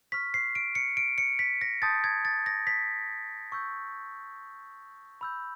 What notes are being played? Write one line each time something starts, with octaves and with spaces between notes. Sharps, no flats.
C#6 F6 B6
C7
D7
C#7
D7
C#7
B6
A#6
A5 C6 D#6 G6 A6
G#6
A6
A#6
B6
C#6 E6 G6
B5 E6 G6